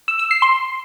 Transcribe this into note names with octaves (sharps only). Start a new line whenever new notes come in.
E6
E6
C7
C6